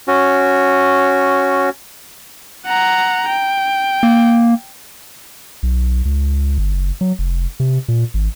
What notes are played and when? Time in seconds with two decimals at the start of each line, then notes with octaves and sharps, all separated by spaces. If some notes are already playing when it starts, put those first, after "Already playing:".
0.08 C#4 F#4
2.66 F#5 A#5
3.28 G5
4.03 A#3
5.63 B1
6.05 C#2
6.58 G1
6.72 F#1
7.01 F#3
7.19 F1
7.60 C3
7.88 A#2
8.14 G#1